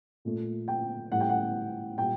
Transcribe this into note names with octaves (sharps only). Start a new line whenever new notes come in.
A#2 A3
G5
A2 G3 F#5
G5
F#5
A#2 G3 G5